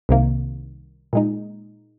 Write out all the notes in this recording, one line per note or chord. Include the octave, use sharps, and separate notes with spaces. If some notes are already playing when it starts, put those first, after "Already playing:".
C2 C3 D#3 A#3
A#2 G#3 D#4